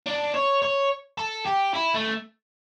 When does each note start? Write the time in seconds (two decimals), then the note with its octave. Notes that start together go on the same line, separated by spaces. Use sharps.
0.06 D4
0.34 C#5
0.62 C#5
1.18 A4
1.46 G4
1.74 E4
1.94 A3